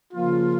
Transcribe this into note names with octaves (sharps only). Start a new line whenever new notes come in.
C#3 F3 A#3 F4